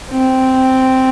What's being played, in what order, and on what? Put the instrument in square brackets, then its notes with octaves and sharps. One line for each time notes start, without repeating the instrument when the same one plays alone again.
[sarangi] C4